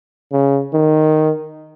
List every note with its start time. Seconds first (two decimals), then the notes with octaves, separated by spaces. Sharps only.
0.32 C#3
0.73 D#3